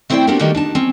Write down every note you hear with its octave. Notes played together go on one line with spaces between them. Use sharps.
A3 C4 E4 C5 D5 G5
B3 C4 D4 F#4 G4 A#4
D#3 G3 A3 A#3 F#4 G4
D4 D#4 A5
C4 C#4